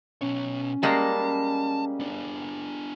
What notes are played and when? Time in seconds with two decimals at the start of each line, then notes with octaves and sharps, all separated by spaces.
0.21 B2 C#4 C#5
0.83 G3 G#3 A#3 A5
2.00 B3 D4